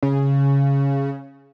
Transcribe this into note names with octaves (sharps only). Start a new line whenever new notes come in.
C#3